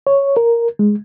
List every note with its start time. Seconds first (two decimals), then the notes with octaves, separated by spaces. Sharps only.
0.07 C#5
0.37 A#4
0.79 G#3